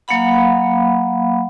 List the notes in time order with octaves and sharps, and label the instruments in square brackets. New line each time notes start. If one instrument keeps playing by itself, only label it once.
[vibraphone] F#3 A#3 F5 F#5 B5